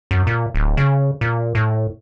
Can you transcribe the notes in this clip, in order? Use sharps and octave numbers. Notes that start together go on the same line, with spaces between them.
F#2
A#2
D1
C#3
A#2
A2